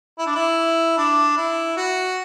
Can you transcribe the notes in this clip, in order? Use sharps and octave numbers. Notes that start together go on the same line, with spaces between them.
E4
D4
E4
D4
E4
F#4